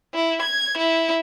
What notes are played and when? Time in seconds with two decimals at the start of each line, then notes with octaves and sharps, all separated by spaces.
0.14 E4
0.42 G#6
0.77 E4